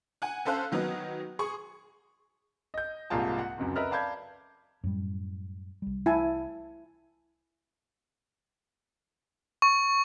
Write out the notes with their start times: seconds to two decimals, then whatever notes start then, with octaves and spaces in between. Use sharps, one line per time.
0.22 F#5 G#5
0.45 C#4 A4 C5 F5 F#6
0.72 D#3 F#3 B3 D#4
1.39 G#4 C6 C#6
2.74 D#5 G6
3.10 C2 G#2 A#3 F4 G#4 A5
3.39 F#5
3.58 F1 C#2 F#2
3.76 A#4 B4 D#5 E5 F6
3.91 D5 F5 A5 B5 G6 G#6
4.84 F#2 A2 G3
5.82 C2 G3
6.06 E4 G#5 A5
9.62 C#6